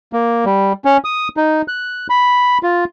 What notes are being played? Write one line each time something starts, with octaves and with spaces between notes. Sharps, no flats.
A#3
G3
C#4
D#6
D#4
F#6
B5
F4